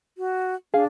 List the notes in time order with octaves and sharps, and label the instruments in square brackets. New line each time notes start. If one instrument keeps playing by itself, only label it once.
[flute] F#4
[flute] D4 [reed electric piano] G#4 F5